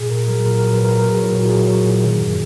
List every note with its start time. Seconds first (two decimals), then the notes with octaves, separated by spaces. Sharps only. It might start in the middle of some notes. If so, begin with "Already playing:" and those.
Already playing: A#2 G#4
0.10 A#2 A#4
0.28 F#3 A#4
0.45 A#2 A#4
0.58 F#3 A#4
0.72 B4
0.81 A#2 A#4
0.97 F#3 A#4
1.10 G#4
1.15 F#3
1.24 E4
1.32 A#2
1.37 F#4
1.49 F#3 G#4
1.68 F#3
1.85 A#2
2.03 D#3
2.20 F#2